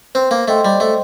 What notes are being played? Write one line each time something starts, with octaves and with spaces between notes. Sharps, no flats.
C4 C5
A#3
A3 D#5 G5 C6
G3
A3 C5